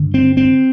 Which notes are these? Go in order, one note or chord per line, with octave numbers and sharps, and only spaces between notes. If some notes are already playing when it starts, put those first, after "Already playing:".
Already playing: G2 D3
C4
C4